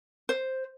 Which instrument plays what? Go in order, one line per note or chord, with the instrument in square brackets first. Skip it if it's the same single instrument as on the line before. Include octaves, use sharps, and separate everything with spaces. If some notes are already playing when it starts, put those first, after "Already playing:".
[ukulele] C5